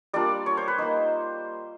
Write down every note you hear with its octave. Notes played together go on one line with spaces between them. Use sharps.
G3 A#3 D4 F4 D5
C#5
C5
B4
A#3 D#4 C5